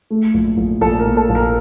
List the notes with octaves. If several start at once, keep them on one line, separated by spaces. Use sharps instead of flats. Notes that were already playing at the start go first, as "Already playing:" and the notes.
A3
A#1
A#1
A#1 A4
A#4
A#2
A4
A#1
A#4